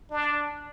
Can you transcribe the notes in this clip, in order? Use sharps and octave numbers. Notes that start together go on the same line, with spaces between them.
D4